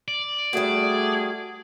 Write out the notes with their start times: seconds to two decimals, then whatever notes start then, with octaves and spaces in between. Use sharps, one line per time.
0.08 D5
0.53 G3 A3 F#4 G#4